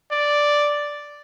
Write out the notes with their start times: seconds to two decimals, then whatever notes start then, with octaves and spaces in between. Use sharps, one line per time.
0.11 D5